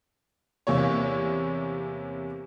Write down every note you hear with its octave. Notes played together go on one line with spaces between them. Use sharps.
E2 C3 A#3 C#5